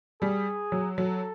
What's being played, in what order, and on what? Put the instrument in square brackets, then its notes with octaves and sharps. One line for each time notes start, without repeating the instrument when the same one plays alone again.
[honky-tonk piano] G3 [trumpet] G#4
[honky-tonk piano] F#3
[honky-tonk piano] F#3 [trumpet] A4